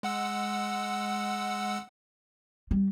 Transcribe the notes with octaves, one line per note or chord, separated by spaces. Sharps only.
G#3 F#5 E6
G3